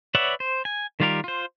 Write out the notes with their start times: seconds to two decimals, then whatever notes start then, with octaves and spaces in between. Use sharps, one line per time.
0.15 B4 C#5 D5 E5 F#5
0.40 C5
0.65 G#5
1.00 D#3 G3 F4 G4 A#4
1.24 F4 C5